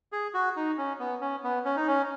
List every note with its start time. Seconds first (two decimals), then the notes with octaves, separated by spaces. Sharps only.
0.12 G#4
0.34 F#4
0.56 D#4
0.78 C#4
1.00 B3
1.21 C#4
1.44 B3
1.65 C#4
1.76 D#4
1.87 C#4